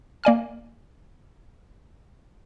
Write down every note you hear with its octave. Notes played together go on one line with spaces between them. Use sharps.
A#3 D5 G#5 F6